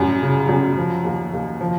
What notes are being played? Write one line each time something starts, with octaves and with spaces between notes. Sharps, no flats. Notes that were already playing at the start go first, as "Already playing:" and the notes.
Already playing: F#2 A2 G3
C#3
F#2
F3
D#2
D#2
F3